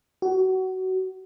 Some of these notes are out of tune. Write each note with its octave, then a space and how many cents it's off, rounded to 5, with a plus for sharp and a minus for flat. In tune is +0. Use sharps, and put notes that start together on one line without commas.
F#4 +25